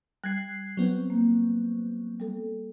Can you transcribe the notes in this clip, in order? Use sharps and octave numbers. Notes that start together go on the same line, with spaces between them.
G3 F#6 G#6 C7
F#3 B3 C4
A#3
G3 A4